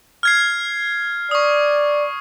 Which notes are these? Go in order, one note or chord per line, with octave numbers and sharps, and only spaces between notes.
F6 G#6 C7
D5 C#6 D#6